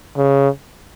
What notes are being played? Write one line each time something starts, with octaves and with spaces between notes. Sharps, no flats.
C#3